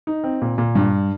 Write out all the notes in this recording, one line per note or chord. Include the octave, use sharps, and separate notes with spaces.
D#4
C4
A#2
A#2
G2